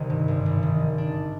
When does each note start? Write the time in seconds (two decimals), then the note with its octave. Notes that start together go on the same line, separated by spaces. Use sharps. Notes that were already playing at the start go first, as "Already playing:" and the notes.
Already playing: C2 C3 D#3 C4 C5
0.10 G2
0.28 G#1
0.46 G#1
0.63 D#3
0.80 D#3
0.98 D4